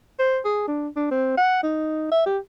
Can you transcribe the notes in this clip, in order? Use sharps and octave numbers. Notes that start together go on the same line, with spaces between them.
C5
G#4
D4
D4
C4
F#5
D#4
E5
G4